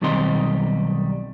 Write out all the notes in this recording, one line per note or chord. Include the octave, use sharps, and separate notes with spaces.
B1 D#3 G3 C4 D#5 C6